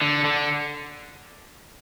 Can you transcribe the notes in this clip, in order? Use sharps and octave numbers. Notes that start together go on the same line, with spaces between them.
D3
D3